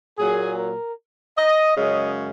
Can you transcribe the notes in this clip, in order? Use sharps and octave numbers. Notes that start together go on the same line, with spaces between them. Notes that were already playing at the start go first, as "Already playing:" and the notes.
A#2 F#3 A#3 G#4
A#4
D#5
F#2 C#3 G#3 C#4 D#5